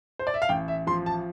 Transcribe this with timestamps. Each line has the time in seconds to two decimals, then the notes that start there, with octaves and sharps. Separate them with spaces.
0.19 C5
0.27 D5
0.34 E5
0.42 F5
0.49 A1 G5
0.68 E5
0.87 F3 C6
1.06 A5